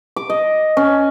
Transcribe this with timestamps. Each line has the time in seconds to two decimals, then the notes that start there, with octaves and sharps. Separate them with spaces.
0.16 D6
0.30 D#5
0.77 C#4